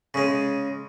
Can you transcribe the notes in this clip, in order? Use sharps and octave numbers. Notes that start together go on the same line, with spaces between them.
C#3 G#3